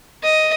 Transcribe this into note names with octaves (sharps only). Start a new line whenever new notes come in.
D#5